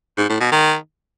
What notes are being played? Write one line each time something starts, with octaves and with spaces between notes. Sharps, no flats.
G#2
A2
B2
D#3